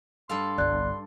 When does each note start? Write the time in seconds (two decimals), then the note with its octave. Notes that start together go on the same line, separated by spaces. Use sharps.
0.29 G2 A4 F5 C6
0.58 G1 C2 D5 F#6